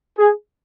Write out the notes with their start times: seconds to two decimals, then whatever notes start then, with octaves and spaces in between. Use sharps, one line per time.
0.18 G#4